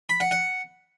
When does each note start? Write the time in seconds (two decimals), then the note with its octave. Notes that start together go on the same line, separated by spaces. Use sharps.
0.09 B5
0.20 F#5
0.31 F#5